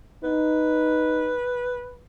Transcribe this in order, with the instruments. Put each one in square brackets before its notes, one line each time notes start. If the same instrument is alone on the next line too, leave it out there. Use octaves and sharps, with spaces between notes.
[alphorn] D#4 [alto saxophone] B4